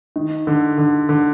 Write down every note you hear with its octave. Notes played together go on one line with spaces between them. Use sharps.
D#3
D3
D3
D3